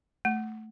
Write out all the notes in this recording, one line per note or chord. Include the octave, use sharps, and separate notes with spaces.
A3